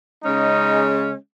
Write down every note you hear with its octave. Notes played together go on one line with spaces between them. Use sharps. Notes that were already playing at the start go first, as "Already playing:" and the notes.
C#3 G#3 C#4 D#4